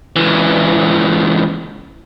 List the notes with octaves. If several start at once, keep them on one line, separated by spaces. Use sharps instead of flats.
C#2 E3